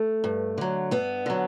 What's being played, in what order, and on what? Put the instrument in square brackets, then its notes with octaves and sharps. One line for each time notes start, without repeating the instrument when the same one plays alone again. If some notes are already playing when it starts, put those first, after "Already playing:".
Already playing: [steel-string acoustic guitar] A3
G2
D3 F#3
G2 B3
D3 F#3